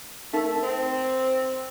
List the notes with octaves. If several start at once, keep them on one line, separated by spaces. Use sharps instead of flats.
A3 D#4 A#4
C4